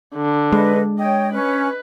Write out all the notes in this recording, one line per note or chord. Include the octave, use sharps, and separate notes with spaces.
D3
G#3 B4 D#5
C#5 D#5 G5
C#4 B4